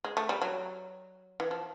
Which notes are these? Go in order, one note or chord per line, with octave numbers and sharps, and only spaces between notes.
G#3
A3
G3
F#3
E3
F3